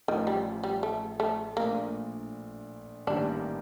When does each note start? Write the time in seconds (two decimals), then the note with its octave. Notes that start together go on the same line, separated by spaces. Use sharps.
0.08 A1 A2 D#3 F3
0.27 G3
0.63 G3
0.83 A3
1.20 A3
1.57 A#1 A#2 A3 A#3 D4
3.07 A1 G2 D#3 G3 A#3 D4